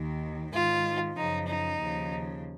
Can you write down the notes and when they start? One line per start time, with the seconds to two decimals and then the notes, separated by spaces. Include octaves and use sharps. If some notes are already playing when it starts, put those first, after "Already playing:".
Already playing: D#2 D#3
0.53 G#2 D#3 F4
1.16 F#2 C#3 F3 D#4
1.47 D#4
1.79 D#2 C#3 F3